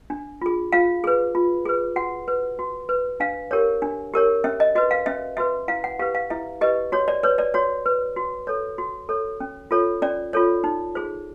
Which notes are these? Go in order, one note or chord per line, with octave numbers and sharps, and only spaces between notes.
D4
F4 G#4
F4 F5
G#4 B4
F4
G#4 B4
F#4 F#5
B4
F#4
B4
D4 F5
G4 A#4 C#5
D4
G4 A#4 C#5
C#4 E5
D#5
F#4 B4 D#5
F5
C#4 E5
F#4 B4 E5
E4 F5
F#5
G4 B4 F5
F5
E4 E5
G4 B4 D#5
F#4 C#5
D5
B4 C#5
D5
F#4 C#5
B4
F#4
A4 C#5
F#4
A4 C#5
C#4
F4 A4 C#5
C#4 D5
F4 A4 C#5
D#4
G#4 C5